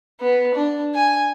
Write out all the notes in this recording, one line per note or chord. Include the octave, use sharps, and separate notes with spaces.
B3
D4
G#5